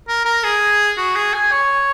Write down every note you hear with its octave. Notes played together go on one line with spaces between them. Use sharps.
A#4
A#4
G#4
F#4
G#4
G#5
C#5